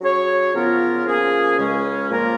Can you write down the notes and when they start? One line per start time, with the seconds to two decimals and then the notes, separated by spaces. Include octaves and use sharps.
0.01 F#3 C#4 G#4 C#5
0.53 C#3 F3 B3 F4 A#4
1.06 F3 A#3 C#4 G#4
1.58 C#2 C#3 G#3 C#4
2.10 A#2 F3 A#3 F4 A#4